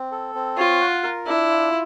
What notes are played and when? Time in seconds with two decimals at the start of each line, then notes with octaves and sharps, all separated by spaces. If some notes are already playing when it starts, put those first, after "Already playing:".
Already playing: C4
0.11 A4
0.35 C4
0.57 F4 C#5
0.81 F#5
1.04 A#4
1.26 D4 E4
1.50 F4